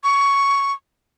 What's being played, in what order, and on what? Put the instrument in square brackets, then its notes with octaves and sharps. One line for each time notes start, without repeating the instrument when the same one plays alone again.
[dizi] C#6